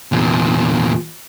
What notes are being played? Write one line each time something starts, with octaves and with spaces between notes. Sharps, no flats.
E2 A#2